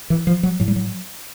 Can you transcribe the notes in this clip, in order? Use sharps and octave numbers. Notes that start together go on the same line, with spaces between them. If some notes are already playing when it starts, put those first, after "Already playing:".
E3
F3
F#3
A2 F#3
G3
F#3